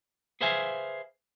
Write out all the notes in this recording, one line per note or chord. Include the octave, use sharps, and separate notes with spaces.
G#4 B4 C5 E5 F5 G#5